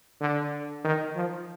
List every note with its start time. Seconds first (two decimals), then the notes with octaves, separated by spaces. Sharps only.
0.21 D3
0.85 D#3
1.16 F3